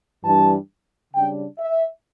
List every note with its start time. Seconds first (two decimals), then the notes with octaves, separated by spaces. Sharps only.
0.24 G2 E3 G3 D4 A5
1.14 C#3 G3 D4 G5
1.59 E5